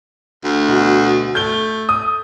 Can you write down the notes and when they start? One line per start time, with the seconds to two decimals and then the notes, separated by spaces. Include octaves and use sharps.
0.44 D2
0.68 B2
1.35 A3 G6 G7
1.89 D#6